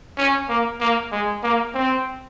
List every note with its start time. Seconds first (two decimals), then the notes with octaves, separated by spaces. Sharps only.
0.18 C#4
0.49 A#3
0.80 A#3
1.12 G#3
1.43 A#3
1.75 C4